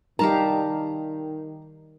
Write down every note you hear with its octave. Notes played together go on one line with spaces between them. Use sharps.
D#3 G3 D#4 G4 A#4 F5 A5 A#5